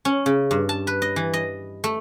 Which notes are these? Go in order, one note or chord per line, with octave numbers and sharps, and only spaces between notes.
C#4
C#3
G2
A5
B4
D#5
E3
D#5
A3